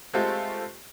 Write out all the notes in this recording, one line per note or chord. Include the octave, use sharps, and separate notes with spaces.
G#3 A3 C4 F4 G4 A4